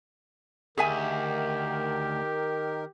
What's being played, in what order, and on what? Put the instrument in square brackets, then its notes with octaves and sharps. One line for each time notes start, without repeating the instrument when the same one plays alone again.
[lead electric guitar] D2 [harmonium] D#3 A#4 [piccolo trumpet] G4 [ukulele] G#4 E5 G#5